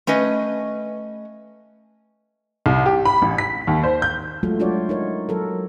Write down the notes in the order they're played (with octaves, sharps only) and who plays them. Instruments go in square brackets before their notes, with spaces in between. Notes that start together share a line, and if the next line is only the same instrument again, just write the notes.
[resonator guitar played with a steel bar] A3 C#4 B4 D#5
[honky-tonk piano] C2
G4
B5
A1
B6
D#2
C5
G6
[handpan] F#3 G#3 A3 F4 F#4 A4
D4 F4 F#4 C#5 D5
D#4 A#4 C#5
F#3 A4 A#4